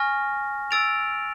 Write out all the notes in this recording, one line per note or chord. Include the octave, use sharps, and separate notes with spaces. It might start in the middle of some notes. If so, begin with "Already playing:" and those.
Already playing: G#5 C#6 F6 A#6
E6 A6 D7 F7